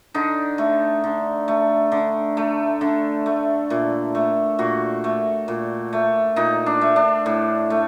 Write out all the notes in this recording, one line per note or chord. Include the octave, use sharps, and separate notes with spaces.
D3 D#4
A3
D3
A3
D3
A3
D3
A3
A#2
A3
A#2 F#4
A3
A#2
A3
A#2 D#4
D4
A3
D4
A2
A3